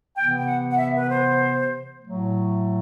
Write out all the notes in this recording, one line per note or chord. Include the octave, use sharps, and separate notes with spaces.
C3 E3 B3 G5
G5
F#5
F#5
E5
B4
C5
A2 F#3 A3